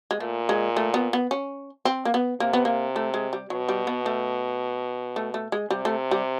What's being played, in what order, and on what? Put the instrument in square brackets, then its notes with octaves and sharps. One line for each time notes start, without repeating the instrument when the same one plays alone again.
[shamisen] G#3
[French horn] A#2 [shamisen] A3
[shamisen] G#3
A3
B3
B3
C#4
C4
A#3
B3
[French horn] C3 [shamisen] A#3
[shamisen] B3
A#3
A3
G#3
G3
[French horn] B2 [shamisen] F#3
[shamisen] G3
B3
A3
A3
A3
G#3
[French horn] C3 [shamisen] G3
[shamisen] A3
G3